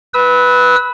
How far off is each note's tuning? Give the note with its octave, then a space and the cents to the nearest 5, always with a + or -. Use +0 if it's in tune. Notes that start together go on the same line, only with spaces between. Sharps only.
B4 +0 E6 -35